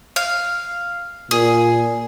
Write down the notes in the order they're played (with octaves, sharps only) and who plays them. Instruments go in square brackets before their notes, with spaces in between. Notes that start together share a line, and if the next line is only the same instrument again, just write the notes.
[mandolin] F5
[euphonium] A#2 [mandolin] G#4